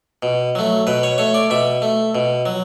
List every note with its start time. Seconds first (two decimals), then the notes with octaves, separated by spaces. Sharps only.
0.23 B2
0.55 F#3 A3
0.87 B2 B4
1.03 C#5
1.18 A3 C#5
1.34 D5
1.50 B2 E5
1.82 A3
2.15 B2
2.46 F#3